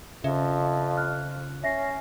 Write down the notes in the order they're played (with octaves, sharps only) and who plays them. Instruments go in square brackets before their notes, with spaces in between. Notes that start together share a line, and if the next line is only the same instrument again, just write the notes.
[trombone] F2 [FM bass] C#3 [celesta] E5
[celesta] F6 F#6
[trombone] C#4 [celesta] E5 A#6 C7